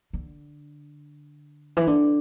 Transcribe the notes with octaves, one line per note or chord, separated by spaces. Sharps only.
D3
E3
D3